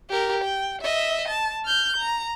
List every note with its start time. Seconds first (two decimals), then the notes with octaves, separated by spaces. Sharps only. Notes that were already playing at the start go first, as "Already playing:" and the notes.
0.10 G4 A#4
0.44 G5
0.82 D#5 E5
1.28 A5
1.65 F6 G6
1.96 A#5